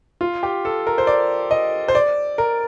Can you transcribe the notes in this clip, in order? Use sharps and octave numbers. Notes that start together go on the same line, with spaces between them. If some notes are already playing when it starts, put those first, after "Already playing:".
F4
G4
A4
A#4
C5
D5
D#5
C5
D5
A#4